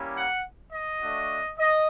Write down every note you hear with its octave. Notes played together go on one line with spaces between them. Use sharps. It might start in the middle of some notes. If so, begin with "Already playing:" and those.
Already playing: G3 A#3 C#4 E4
F#5
D#5
A3 D4 F#4
D#5